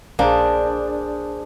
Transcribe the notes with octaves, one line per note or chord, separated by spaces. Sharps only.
A#1 A#3 D4 G#4 C5 G#5